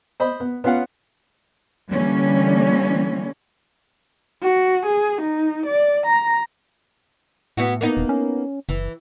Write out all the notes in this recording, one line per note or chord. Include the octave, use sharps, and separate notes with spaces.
C5 D#5 B5
B3
B3 C#4 F4 F5 F#5
D3 E3 G3 A#3 C#4
F#4
G#4
D#4
D5
A#5
A2 B3 E4 F#4
A#3 B3 D#4
D#1
C#4
F#1 E3